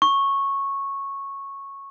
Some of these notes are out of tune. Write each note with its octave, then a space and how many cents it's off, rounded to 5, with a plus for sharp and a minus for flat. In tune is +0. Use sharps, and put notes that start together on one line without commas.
C#6 -10